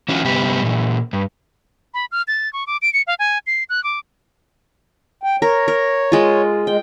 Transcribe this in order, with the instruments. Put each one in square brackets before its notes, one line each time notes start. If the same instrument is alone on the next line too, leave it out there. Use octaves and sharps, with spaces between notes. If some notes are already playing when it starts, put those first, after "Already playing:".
[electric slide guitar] E3 C#4 F4 F#4
G2 C3 G3 B3 G4
A#2 E3
G2
[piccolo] B5
F6
A6
C#6
D6
D7
C#7
F5
G#5
C7
F#6
D6
[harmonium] G5
[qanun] A#4 [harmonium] C#5
[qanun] A#4
G#3 F4
[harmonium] G#3 [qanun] G5